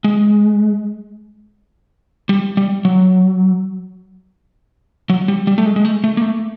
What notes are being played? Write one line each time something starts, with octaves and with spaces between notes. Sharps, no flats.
G#3
G3
G3
F#3
F#3
G3
G3
A3
G#3
G#3
A3
A3
A#3
A3